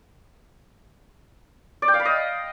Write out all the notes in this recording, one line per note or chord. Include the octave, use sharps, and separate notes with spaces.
D5
G5
F5
B5
D#5